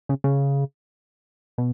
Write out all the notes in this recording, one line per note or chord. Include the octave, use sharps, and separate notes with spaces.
C#3
C#3
B2